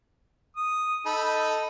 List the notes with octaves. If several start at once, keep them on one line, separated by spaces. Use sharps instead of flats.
D#6
D#4 A4 B5